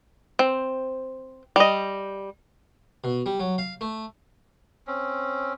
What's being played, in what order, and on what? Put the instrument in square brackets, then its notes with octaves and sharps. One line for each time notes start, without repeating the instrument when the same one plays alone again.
[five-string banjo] C4
G3 D#5
[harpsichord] B2
G3
F#3
F5
A3
[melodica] C4 C#4